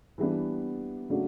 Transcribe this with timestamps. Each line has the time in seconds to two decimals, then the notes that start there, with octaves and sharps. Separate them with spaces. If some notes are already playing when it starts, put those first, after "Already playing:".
0.18 E3 G3 B3 D4
1.10 C#3 F#3 A3 D4 F#4